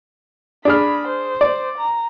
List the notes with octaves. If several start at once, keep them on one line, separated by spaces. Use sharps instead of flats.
D4 G#4 B5 F6
C5
D5
A#5